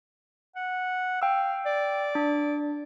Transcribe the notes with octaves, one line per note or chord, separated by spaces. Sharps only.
F#5
F5 G5 E6
D5
D4